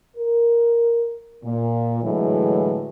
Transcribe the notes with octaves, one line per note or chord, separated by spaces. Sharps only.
A#4
A#2
A2 D3 E3 F#3 G#3